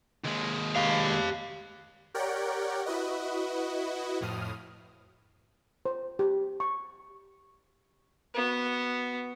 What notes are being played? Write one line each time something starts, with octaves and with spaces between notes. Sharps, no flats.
D#2 G#3
G4 F5
G4 A#4 C#5 D5 F#5 G5
E4 F#4 B4 D#5
F2 A2 D#6 F6
C5
G4
C#6
B3 F#4